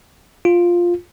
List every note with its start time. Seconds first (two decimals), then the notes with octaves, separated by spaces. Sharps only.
0.45 F4